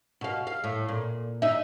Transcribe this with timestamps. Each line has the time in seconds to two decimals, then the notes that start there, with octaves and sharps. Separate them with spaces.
0.21 B2 F5
0.47 F5
0.64 A2
0.89 A#2
1.42 D#4 E5